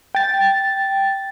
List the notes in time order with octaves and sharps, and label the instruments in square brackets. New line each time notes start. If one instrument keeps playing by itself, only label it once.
[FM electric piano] G5 A6